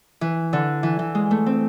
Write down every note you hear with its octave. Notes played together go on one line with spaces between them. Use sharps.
E3
D3
E3
E3
G#3
A3
C4